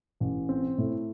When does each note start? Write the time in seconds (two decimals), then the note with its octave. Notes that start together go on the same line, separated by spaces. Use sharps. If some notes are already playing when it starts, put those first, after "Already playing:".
0.20 A1
0.49 C4
0.78 A2